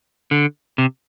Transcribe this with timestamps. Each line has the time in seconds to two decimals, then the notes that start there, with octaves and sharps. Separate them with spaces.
0.31 D3
0.78 C3